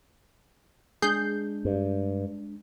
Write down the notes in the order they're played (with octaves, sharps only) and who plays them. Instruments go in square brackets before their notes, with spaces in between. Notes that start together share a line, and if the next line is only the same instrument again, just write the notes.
[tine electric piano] G#3 D4 [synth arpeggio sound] G#4 G6 C7
[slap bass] G2